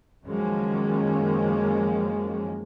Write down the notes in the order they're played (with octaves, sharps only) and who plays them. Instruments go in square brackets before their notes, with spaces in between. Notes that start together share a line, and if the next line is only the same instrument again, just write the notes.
[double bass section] F#2 D#3 F3 G#3 A#3 C#4